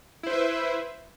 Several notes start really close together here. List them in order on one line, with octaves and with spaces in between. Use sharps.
E4 C5 B4 E5